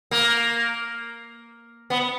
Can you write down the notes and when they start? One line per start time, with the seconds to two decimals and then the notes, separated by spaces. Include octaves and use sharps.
0.11 A#3
1.90 B3